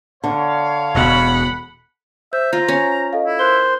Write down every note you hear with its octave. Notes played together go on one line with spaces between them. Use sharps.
D3 C#5 F5
E1 B2 F#5 B5
C5 E5 G6
F4 A#5
C#4
A4 D#5 F5
E4
A#4 C5 F#6 G7